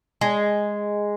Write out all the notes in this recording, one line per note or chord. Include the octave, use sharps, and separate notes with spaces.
G#3